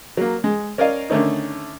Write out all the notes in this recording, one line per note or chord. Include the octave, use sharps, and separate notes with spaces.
F#3 A#3
G#3
C#4 A#4 D5 D#5 F5
D3 D#3 A3 C#4 D#4